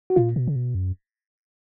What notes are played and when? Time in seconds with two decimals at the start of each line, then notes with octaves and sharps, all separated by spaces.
0.10 F#4
0.16 A#2 F4
0.36 B2
0.47 C#3
0.56 B2
0.75 F#2